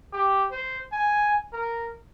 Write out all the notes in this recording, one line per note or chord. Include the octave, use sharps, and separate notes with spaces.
G4
C5
G#5
A#4